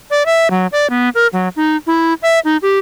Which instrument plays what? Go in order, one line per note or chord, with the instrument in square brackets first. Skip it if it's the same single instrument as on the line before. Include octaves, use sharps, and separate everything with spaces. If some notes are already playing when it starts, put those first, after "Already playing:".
[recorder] D5
E5
F#3
D5
B3
A#4
F#3
D#4
E4
E5
D#4
G4